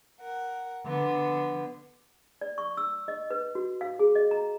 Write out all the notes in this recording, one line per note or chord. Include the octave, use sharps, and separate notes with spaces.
A#4 F#5
D3 B3
D5
C#6
E6
D#5
B4
F#4
F5
G#4
D#5
A#5